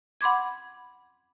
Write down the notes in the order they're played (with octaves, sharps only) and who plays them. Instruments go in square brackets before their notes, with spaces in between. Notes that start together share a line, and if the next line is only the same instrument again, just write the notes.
[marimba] F#5 B5 C6 D6 G#6